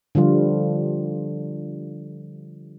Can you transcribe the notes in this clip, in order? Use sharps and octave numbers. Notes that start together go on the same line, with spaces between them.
D3 F3 G3 F4